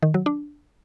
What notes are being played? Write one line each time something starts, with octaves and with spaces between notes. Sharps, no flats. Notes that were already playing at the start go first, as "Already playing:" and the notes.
D#3
F#3
D4